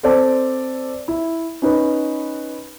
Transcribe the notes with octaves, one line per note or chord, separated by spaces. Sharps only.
C4 A4 C5 D5 A5
E4
C#4 D#4 B4